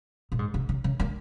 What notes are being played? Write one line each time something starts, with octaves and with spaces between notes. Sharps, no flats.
A#2
G#2
C3
C#3
C#3
A#3